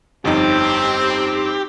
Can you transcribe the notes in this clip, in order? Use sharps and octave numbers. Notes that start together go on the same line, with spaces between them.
G1 F2 C4 D#4 G4